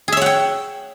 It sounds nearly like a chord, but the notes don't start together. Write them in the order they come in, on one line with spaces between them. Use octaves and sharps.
G#4 E5 C#5 F#5 G5